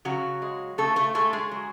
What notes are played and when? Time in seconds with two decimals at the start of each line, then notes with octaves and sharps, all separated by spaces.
0.05 C#3 F#3 F#4
0.42 G#3
0.78 C#3 A3 A4
0.96 A3 A4
1.15 G#3 A3 A4
1.33 G#3 G#4
1.52 F#3